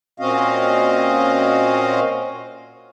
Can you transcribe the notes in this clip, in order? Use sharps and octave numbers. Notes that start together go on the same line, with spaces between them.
A#2 C4 C#4 F#4 D#5 F5